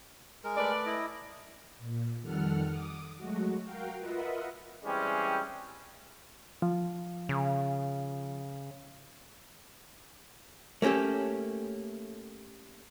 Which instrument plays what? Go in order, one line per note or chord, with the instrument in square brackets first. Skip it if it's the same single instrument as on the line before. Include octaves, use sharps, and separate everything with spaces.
[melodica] G#3 A#4
[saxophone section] A3 B4 D5
[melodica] E4 D#5
[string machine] A#2
F2 D#3 G3 A4 F#5 F6
D6 D#6
F#3 G#3 A3 F#4
F#4 A#4 F5 G5
F4 A#4 B4 D#5 E5 F#5
[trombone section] E3 G3 G#3 C4 C#4
[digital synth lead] F3
[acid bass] C#3
[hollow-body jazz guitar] A3 A#3 C#4 G4 A4